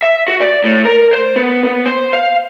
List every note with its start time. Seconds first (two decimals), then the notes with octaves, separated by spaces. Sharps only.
0.03 E5
0.28 F#4
0.40 D5
0.64 A2
0.85 A#4
1.13 C5
1.36 B3
1.65 B3
1.86 C5
2.13 F5